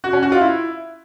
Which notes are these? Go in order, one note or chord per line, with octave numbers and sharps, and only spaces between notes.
F#4
C#4
F#4
F4
E4